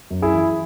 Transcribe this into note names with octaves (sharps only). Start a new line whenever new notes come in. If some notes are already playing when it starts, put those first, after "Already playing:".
F#2
E4 G#4
E3